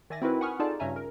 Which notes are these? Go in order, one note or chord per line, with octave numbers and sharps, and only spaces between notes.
D#3 D5 E5 G#5 A6 A#6
C4 D#4 E4 F#4 A#4 B4
F#5 G#5 B5 C#6 D#6 F6
D#4 F4 G#4 A4 D5 A5
G2 C#3 C#4 E5 G#5 A#5
A#4